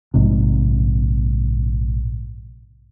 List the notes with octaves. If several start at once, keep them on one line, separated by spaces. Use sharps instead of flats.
A#1 G#2 C3